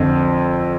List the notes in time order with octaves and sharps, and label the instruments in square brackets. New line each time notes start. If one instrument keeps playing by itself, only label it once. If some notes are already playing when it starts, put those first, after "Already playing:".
Already playing: [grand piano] F2 D3 F3